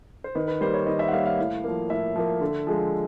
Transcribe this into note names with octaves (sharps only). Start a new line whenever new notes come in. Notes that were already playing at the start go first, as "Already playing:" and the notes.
C5
D#3 B4
B4
G3 A#3 C5
C#5
D#3 D#5
E5
F#5
G3 A#3 F5
F5
A2
F3 A#3
A2 E5
F3 A#3
D3
F3 G#3